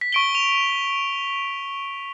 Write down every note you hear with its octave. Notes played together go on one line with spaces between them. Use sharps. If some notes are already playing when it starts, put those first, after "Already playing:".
B6
C#6 D7 G7
F7